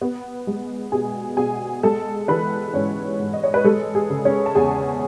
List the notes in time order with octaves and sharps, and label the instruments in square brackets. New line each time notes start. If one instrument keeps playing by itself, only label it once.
[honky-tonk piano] B3
G#3
B2 G#4 G#5
B2 G#4 G#5
G#3 A4 A5
E3 B4 B5
G#2 C#4 C#5
G#2
D#5
C#5
B4
G#3 A4
G#4
C#3
C#4 C#5
A5
E2 G#4 G#5